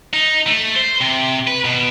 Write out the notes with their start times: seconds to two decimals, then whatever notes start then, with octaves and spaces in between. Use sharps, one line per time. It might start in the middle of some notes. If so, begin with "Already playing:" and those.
0.13 D#4
0.47 A3
0.76 C5
1.01 C3
1.48 B4
1.65 B2